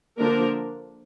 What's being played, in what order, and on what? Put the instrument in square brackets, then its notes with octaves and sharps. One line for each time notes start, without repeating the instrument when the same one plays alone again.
[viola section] D3 F3 A#3 D4 A#4